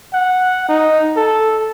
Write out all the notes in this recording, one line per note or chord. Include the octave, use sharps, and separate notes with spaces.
F#5
D#4
A4